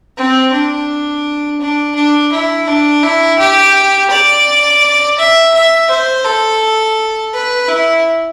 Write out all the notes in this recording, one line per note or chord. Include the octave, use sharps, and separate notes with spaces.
C4
D4
D4
D4
E4
D4
E4
G4
D5
E5
E5
C5
A4
B4
E4